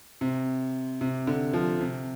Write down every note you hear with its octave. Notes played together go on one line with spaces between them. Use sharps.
C3
C3
D3
F3
C3